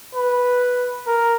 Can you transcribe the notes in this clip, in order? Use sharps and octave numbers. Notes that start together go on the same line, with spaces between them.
B4
A#4